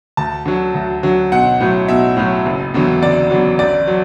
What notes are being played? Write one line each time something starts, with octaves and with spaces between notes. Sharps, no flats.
D2 A5
D3 F#3
D2
D3 F#3
B1 F#5
A2 F#3
B1 E5
A2 F#3
F#1
E2 D3 F#3
F#1 D5
E2 D3 F#3
A1 D5
F#3